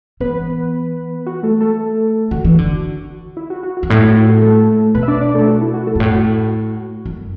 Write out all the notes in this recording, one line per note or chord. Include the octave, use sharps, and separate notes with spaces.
E3 B3 B4
F#4
A3 A4
A3 A4
D3 F#4
E3
D3
E4
F#4
F#4
F#4
F#2
A2 E4
F#4
E4
F#4
A3 A4
B2 B3 B4
E5
D4 D5
D4 D5
A3 A4
F#4
E4
F#4
A3 A4
F#2
A2 F#4
F#2